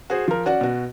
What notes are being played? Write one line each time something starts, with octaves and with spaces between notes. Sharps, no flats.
F#4 G#4 C5
F3 A#4
C#4 F#4 D5 F#5
B2 F#4